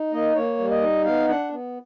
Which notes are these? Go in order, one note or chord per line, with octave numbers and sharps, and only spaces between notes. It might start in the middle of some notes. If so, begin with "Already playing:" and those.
Already playing: D#4
A#3 D#5
A#3 C#5
G3
D#5
D#4
B3 F5
D4 F#5
B3